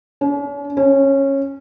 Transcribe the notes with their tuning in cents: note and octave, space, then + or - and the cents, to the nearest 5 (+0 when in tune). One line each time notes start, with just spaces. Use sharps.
C#4 +45
C#4 -15